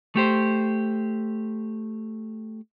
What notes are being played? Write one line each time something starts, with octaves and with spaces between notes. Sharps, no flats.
A3 G4 C5